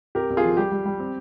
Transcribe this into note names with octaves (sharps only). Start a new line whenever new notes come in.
C2 G4 A#4
C2
F4 G#4
F3
G3 G4
G3
G3
C4